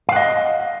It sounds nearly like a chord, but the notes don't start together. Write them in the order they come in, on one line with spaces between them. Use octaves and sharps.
F5 F#5 D#5